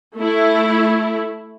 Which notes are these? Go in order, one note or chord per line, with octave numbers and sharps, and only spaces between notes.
A3 E4